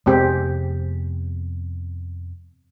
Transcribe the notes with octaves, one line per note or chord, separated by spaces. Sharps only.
F2 C3 G#3 B3 C4 G4